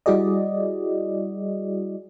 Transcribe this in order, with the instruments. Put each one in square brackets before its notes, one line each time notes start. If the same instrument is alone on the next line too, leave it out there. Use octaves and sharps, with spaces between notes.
[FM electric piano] G3 E4 F#4 G#4 D5 D#5